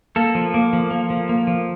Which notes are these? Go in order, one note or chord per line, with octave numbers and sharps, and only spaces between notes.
A#3 A4
F3
A#3
F3
A#3
F3
A#3
F3